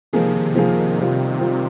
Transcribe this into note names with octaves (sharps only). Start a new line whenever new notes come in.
C3 D#3 F3 A#3 F4 G#4
F3 A#3 F4 G#4
G3 C4 F4
G3 C4 F4